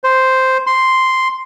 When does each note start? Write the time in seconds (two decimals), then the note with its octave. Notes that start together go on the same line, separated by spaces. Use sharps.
0.04 C5
0.67 C6